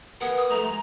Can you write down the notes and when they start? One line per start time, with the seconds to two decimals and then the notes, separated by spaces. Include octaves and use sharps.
0.21 B3 G#4 A#4 F#5
0.37 D#6
0.50 A3 D#4 A#5
0.64 G#3